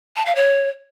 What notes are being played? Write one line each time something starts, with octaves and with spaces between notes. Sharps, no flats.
A5
F5
C#5